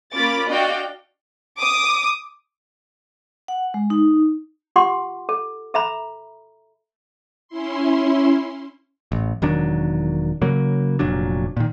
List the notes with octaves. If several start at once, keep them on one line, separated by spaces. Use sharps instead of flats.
A#3 C#4 F4 B5 D6 A6
D4 F#4 D5 D#5 F5 G5
D6 D#6
F#5
G#3
D#4
F4 G4 F#5 C6 D6
A4
A4 E5 A#5 B5
C#4 E4 C6
A1
E1 D#3 F#3 D4
C#3 F#3 A#3
F1 A#2 F#3 D4
A#2 D#3